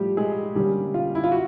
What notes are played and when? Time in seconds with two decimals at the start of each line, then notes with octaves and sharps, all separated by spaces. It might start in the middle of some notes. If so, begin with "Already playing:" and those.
Already playing: A2 F3 G3 A3 G4
0.17 G#3 G#4
0.55 D3 G3 A#3 C#4 G4
0.94 F4
1.15 E4
1.24 F4
1.32 F#4